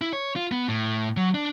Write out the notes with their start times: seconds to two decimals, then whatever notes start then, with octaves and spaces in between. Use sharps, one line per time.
0.01 E4
0.13 C#5
0.36 F4
0.52 B3
0.68 A2
1.17 F#3
1.34 D4